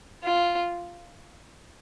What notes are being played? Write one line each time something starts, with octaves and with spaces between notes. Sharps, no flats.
F4